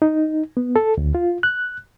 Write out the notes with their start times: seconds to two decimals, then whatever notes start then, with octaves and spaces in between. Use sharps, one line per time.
0.02 D#4
0.57 B3
0.76 A4
0.98 D2
1.15 F4
1.43 F#6